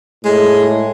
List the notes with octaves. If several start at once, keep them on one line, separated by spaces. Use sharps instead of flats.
A2 G#3